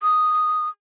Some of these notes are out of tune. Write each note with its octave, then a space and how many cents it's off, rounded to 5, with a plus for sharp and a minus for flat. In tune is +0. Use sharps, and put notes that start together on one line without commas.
D#6 -5